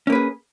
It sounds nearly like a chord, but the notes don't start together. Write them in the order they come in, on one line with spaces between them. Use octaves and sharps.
C#4 A#3 B4 G#4